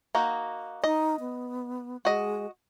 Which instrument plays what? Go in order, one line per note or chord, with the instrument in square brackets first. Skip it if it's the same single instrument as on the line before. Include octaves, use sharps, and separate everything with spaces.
[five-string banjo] A#3 D#4 F#4
[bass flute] D#4 [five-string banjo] D#5
[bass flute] B3
[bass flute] G#3 [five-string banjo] F#4 D#5